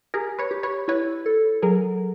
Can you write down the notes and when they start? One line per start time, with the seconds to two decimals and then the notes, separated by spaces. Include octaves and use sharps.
0.14 G4 G#4 A#4
0.39 B4 C#5
0.51 G4
0.63 B4 C#5
0.88 E4 B4 C#5
1.26 A4
1.62 F#3 G#4 A#4